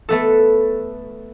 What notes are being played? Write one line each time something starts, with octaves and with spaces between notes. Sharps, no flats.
A3 B3 A4